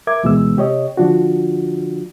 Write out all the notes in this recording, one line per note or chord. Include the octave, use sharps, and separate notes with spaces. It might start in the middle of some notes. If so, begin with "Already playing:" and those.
A#4 E5 D6 G#6
D2 B2 E3 G#3 B3 E6
C3 G4 C#5 D#5
D3 F3 D4 F4 F#4